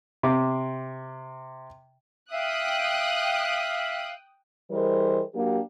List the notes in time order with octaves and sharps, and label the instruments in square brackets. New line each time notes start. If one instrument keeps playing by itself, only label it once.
[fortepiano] C3 D6
[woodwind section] E5 F5 [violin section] G5 D#6 F#6
[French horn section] E3 G3 G#4 A#4 C5 D#5
F#3 A#3 D4 G4